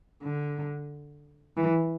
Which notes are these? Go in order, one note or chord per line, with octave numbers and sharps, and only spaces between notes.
D3
E3